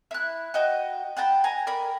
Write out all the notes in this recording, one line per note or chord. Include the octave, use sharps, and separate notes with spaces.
E4 F#6
F#4 D#5 G5
F#5 G5 A5 B5
G#5 A#5
A#4 D5 B5